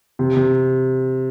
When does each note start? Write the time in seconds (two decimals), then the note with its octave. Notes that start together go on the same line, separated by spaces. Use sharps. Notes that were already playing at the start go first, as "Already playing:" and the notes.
0.19 C3
0.36 C3